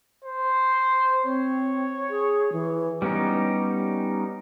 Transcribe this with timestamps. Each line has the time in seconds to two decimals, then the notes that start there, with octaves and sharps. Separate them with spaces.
0.25 C5
1.24 C4 C#5
2.10 G#4
2.52 E3
3.02 G3 B3 C#4 D#4 G4